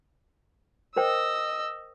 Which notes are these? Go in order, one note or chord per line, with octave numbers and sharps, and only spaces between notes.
A#4 C5 D#5 G5 E6